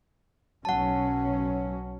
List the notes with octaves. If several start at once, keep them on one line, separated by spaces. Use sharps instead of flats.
B1 F#3 C#4 F#5 A5